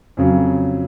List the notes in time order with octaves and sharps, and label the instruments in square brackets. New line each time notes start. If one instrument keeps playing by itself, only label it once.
[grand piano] F2 C#3 F#3